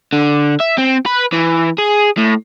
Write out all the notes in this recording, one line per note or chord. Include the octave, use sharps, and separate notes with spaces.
D3
E5
C4
B4
E3
G#4
A2